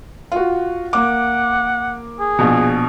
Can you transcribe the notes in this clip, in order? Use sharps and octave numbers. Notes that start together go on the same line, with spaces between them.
F4 F#4
A#3 F#5 D6
G#4
A#1 B2